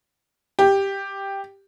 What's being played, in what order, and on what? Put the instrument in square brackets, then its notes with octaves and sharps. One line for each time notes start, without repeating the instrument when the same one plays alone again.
[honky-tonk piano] G4